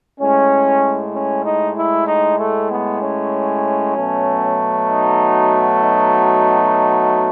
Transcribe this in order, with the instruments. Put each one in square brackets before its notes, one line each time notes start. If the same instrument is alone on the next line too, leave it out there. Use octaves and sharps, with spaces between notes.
[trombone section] A2 G#3 C#4
C#4
D#4
E4
D#4
A3
B3
C#4
B2 F#3 A3
D#4
D#4